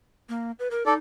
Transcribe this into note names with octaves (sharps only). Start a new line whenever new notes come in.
A#3
B4
A#4
D#4 A4 D5